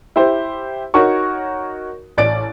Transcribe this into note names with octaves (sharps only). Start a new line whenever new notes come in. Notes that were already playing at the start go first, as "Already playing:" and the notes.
E4 G4 C5
D#4 F#4 A#4 C#5 C#6
A1 D5 A6 D7